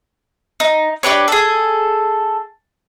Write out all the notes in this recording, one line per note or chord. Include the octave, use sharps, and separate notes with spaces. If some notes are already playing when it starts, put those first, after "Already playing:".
D#4
D4 G4 B4 C#5
G#4 A4